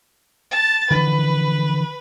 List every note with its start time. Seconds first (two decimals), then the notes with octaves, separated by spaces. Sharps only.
0.51 A5 A6
0.91 D3 E3 F3 B4